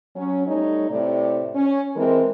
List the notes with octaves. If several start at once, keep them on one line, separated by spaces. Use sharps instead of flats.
F#3 C#4
G3 A3 D#4 C#5
A2 C3 D5
C#4
E3 G#3 C4 A#4